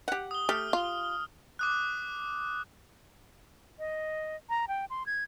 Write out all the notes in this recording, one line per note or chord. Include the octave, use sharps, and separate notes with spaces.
G4 F#5
D#6 G7
A3 G4 F6
F4
D6 D#6 F#6
D#5
A#5
G5
C6
G#6